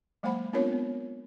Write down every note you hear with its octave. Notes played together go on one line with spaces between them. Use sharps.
F#3 G#3 A#3 C5 F#5 B5
B3 C4 D4 F4 A#4 C#5
B3